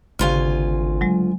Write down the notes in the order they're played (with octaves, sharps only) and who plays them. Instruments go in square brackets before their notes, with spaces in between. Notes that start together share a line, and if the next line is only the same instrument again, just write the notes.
[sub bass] G#1 [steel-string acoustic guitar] D2 F4 G#5 [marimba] C#3 G4 F5
[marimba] F#3 G#3